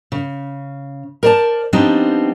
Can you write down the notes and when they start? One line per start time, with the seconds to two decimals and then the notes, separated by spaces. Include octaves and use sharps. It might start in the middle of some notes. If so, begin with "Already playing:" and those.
0.12 C#3
1.23 A#4 C5 D5 G#5 A5
1.73 F3 G3 B3 C4 D4 D#4